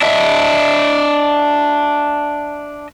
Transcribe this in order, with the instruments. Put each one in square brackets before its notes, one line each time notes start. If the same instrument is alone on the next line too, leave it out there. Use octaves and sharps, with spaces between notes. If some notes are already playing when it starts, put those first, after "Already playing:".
[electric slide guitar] D4 D#5 E5